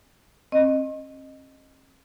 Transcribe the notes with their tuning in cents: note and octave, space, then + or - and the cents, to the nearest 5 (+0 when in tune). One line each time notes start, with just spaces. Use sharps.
C4 +45 D#5 -10